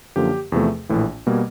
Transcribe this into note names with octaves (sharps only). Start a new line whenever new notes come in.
F#2 D3 F3 A#3 G4
E2 C3 F3 A3
A#1 A2 E3
B2 G3 A#3